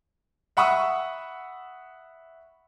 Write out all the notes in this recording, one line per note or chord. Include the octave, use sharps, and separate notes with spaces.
E5 F#5 B5 C#6 D#6 E6